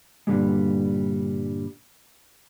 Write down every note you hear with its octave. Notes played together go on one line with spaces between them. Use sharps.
G2 A#2 D3 D#3 G3 G#3